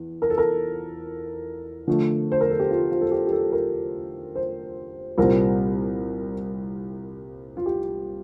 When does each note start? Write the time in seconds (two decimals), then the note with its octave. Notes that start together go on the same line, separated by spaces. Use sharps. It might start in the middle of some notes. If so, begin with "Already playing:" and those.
Already playing: E2
0.22 A#4
0.30 A4
0.38 A#4
1.87 D3 F3 A3
2.32 C5
2.41 A#4
2.50 A4
2.60 G4
2.71 F4
2.91 F4
3.01 A4
3.12 G4
3.27 G4
3.32 A4
3.52 A#4
4.36 C5
5.18 C2 A#2 G3 C4 A#4
7.57 F4
7.66 G4